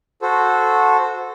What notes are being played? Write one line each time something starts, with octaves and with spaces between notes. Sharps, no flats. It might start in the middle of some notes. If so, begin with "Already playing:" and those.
F#4 A4 C5